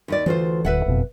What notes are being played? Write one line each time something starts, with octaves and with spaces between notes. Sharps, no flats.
D#2 D#4 D5
D2 E3 F4 C5
D1 D2 B4 E5 F#5
F#1 F2 B2